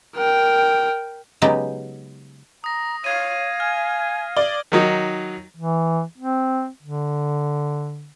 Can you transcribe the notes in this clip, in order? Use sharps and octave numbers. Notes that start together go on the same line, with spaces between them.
A#4 G5
C#3 F#3 G#3 B3 D#4 G4
A#5 D#6 A#6
C#5 F5 G#6 D#7
G#5 F6 G#6
D5 G7
D#3 F#3 D#4
E3
C4
D3